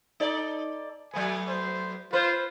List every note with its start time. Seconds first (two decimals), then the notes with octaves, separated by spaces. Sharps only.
0.20 D#4 A4 D5
1.13 F#3 A3 B3 G#5
1.48 C5
2.13 F4 B4 C5